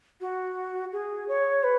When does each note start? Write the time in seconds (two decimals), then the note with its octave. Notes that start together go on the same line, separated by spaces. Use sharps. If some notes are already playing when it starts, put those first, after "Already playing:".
0.20 F#4
0.92 G#4
1.28 C#5
1.63 B4